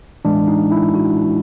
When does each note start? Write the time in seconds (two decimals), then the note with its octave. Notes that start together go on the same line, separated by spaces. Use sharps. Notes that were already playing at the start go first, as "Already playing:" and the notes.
0.25 A2 E3 G#3 D4
0.48 D#4
0.72 E4
0.95 F#4